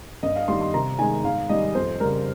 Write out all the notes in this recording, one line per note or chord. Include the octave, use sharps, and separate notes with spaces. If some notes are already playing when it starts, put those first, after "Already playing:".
G2 D#5
F5
D#3 G3 C6
C6
C3 A#5
D#3 G#3 G#5
G#2 F5
D#3 G3 D#5
F2 C5
C#3 G3 A#4